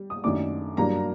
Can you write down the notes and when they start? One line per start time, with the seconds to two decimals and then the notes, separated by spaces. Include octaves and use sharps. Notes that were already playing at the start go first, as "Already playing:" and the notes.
Already playing: G3
0.10 D#6
0.24 F#2 D#3 A3 D4 D6
0.77 G2 F#3 A#3 D4 A#5